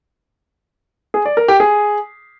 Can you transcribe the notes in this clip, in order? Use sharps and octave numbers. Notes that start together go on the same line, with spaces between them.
G#4
D5
A#4
G4
G#4